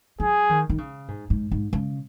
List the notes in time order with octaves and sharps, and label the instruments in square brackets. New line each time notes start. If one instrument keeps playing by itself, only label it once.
[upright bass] F#3 [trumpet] G#4
[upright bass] D#3
D#3
C#3
G#2
G#2
G#2
C#3